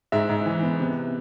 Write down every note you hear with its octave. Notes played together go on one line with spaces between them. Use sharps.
G#2 E5
G#2
E3
B3
C3